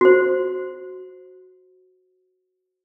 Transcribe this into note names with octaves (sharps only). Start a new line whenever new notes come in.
F#4 C5